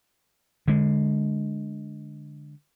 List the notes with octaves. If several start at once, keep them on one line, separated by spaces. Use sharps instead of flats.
D3 G#3